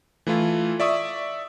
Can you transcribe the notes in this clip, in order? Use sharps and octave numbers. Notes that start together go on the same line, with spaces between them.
E3 A3 E4 F4
D5 E5 C#6 D#6